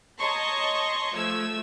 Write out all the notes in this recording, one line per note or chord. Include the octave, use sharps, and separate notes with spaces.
C#5 D#5 A5 A#5 C6 C#6
F3 A3 E6 G#6